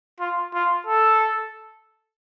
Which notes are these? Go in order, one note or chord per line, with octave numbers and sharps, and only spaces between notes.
F4
F4
A4